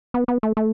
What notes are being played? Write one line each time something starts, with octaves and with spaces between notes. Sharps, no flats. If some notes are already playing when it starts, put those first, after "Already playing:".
B3
B3
A3
A3